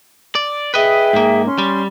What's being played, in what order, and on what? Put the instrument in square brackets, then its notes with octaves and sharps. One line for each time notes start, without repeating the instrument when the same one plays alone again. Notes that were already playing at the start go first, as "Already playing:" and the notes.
[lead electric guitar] D5
[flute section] G#4 E5 G5 [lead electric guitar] B4 D#5
[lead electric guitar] G#2 A#3
[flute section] C#4 C6
[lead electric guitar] G3